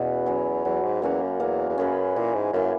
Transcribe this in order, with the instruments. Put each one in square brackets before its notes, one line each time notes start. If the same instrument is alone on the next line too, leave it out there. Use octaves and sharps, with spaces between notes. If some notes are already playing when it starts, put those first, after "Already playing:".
Already playing: [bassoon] E2 [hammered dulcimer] B2 C#4 F#4 B4
[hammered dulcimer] F#3 C#4
[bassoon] E2 [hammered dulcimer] F#3
[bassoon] G#2
[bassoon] E2 [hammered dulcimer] A#3 C#4 F#4
[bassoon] F#2
[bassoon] E2 [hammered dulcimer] A#3
[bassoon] E2
[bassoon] F#2 [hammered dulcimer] C#4 G#4 B4
[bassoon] A#2 [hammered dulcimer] E3
[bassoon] G#2
[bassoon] F#2 [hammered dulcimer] A#3 E4